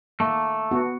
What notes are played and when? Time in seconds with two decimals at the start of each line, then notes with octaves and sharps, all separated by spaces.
0.20 A3 A#3
0.71 B3 F#4